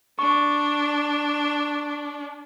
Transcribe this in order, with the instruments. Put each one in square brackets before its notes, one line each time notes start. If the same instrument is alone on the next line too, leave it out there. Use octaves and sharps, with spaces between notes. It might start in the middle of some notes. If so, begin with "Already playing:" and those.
[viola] D4 [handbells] C#6